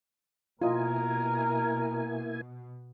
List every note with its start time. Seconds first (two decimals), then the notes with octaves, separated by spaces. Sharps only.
0.62 B2 A#3 E4 F4 A#4 D#5 G#5